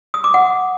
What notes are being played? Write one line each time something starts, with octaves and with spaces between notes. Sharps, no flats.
D#6
D6
F#5